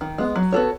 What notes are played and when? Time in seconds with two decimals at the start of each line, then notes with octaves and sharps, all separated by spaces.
0.01 D#3
0.18 G#3 B3
0.36 F#3
0.52 B3 F#4 A4 C#5